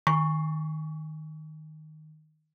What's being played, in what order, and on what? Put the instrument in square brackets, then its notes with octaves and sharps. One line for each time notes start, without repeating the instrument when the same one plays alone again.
[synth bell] D#3 [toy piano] C#6